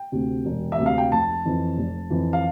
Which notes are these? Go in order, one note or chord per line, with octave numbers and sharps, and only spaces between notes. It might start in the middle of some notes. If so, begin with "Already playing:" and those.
Already playing: G5
D2 C3
E1
E5
D2 C3
F5
G5
F1 A5
F2 E3
F1
F2 E3
F5